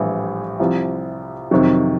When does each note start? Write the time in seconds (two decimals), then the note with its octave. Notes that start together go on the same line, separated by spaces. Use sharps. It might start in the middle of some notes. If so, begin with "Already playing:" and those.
Already playing: A#1 A2 E3 G3
0.60 C2 C3 F3
1.51 F2 C3 D#3 F#3